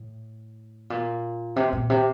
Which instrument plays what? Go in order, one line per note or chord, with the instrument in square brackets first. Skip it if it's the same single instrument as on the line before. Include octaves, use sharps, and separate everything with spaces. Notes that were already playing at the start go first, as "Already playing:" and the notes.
Already playing: [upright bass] A2
A#2
C3
A#2
C3